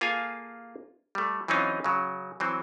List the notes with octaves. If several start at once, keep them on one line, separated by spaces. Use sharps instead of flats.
A#3 F4 G#4 A4 F5 G#5
G3 A3
E3 F#3 C4 C#4 D#4 F4
C#3 F#3
E3 F#3 C4